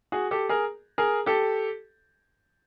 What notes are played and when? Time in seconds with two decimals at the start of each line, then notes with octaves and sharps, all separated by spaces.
0.12 F#4 G#4
0.31 G4 A4
0.49 G#4 A#4
0.98 G#4 A#4
1.26 G4 A4